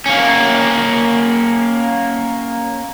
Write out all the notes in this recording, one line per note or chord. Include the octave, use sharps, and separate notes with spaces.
A#3 C#4